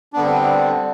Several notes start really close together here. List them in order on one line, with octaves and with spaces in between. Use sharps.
D4 B3 D3 G3 C4